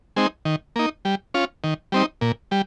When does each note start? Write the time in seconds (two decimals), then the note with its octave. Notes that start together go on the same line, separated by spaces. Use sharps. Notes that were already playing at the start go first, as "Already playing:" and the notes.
0.16 G#3 C4 D#4
0.45 D#3
0.76 A#3 D#4
1.05 G3
1.34 C#4 F4
1.64 D#3
1.92 G3 C4 D#4
2.21 A#2
2.51 G3